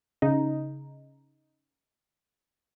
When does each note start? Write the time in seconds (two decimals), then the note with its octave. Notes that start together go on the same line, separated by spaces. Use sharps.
0.22 C#3 D#4